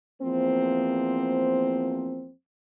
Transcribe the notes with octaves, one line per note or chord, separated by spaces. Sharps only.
E2 F3 A#3 C4 C5